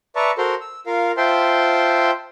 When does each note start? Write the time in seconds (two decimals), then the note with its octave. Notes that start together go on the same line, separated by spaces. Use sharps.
0.16 B4 D5 E5 A5 A#5 C#6
0.38 F#4 A4 A#4 C5 A#5 C6
0.61 E6
0.86 F4 A#4 F5
1.17 F4 C5 E5 G5 A5 C6